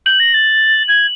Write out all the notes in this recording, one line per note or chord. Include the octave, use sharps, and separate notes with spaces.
G6 F#7
A#6
A6
G#6